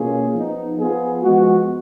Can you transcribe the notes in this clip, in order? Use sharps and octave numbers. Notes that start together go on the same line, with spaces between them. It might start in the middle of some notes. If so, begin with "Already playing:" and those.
Already playing: B2 A#3 C#4 F4 G#4
F3 B3 D#4
F3 B3 F4 G#4
F3 G#3 B3 F#4